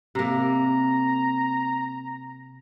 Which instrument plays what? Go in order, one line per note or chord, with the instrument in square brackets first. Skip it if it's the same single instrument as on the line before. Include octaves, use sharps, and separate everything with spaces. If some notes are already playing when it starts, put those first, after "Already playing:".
[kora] C3 A#3 [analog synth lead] A#5